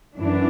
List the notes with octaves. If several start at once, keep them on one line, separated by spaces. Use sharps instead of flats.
F#2 E3 D4